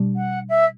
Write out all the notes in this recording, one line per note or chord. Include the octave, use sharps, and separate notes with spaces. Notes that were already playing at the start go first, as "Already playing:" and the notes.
Already playing: B2 G3 D4
F#5
E5